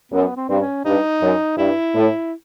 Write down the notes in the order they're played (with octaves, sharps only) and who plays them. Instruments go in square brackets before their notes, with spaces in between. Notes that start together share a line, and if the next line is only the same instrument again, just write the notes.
[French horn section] F#2 [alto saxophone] B3
[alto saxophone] C4
[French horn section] G2 [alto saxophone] C4
[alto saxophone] C#4
[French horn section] G2 [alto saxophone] D#4
[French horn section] F#2
[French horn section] G2 [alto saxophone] E4
[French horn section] A2